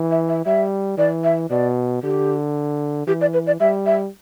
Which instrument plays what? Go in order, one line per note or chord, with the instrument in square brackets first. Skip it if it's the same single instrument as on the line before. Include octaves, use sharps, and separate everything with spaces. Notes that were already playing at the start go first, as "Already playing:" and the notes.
Already playing: [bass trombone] E3
[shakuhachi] E5
E5
[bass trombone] G3 [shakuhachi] E5
[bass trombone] E3 [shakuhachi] D5
[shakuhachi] E5
[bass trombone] B2 [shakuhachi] D5
[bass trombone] D3 [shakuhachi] G4
[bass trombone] E3 [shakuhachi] G4
[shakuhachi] D5
B4
D5
[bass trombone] G3 [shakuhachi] E5
[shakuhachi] E5